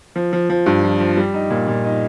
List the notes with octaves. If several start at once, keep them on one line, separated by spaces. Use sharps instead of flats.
F3
F3
F3
G2
F3
F3
G3
D#4
A#2
A#2
D#4